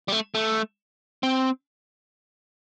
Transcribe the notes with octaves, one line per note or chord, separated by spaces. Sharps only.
G3
A3
A3
C4